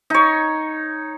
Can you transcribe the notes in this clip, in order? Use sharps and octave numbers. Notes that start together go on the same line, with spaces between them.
D#4 C#5